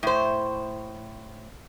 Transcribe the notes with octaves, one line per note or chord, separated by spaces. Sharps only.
A2 C5